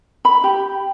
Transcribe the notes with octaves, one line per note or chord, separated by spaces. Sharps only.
B5
G4